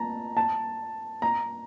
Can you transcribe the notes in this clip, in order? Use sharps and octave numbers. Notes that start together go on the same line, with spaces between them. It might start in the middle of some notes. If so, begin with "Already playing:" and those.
Already playing: A5 A#5
A5
A#5